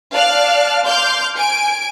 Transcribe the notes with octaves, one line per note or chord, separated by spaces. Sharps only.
D5 F5 A5 F6 F#6
C6 D6 F6 G6
G#5 D7